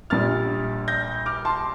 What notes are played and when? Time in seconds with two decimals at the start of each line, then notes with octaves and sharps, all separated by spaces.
0.10 A#1 A#2 G3 D4 F6 A6
0.88 G6 A#6
1.26 D6 F6
1.45 A5 C6